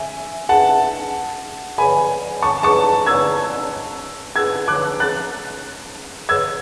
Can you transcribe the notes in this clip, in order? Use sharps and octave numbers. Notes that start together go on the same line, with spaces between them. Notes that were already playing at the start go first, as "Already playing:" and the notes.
Already playing: E5 G#5
F#5 A5
G#5 B5
A5 C#6
A5 C#6
E6 G#6
E6 G#6
D6 F#6
F#6 A6
E6 G#6